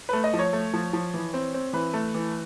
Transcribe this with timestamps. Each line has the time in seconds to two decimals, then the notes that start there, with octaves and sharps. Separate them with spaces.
0.09 A3 B4
0.24 D#5
0.34 F3
0.39 C#5
0.53 A3
0.73 F3
0.93 F3
1.14 E3
1.34 C4
1.54 C4
1.73 E3 B4
1.93 A3
2.15 E3